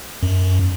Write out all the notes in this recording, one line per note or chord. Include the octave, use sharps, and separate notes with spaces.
F#2